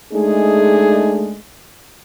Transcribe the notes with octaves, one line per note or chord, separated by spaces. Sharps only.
G#3 A3 D4 D#4 G#4